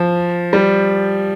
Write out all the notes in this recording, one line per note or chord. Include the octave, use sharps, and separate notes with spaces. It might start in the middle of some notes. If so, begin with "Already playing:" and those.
Already playing: F3
G3